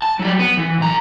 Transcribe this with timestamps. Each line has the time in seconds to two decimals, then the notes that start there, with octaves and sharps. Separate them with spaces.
0.02 A5
0.19 F#3 G3
0.39 B3
0.57 E3
0.80 B1 A#5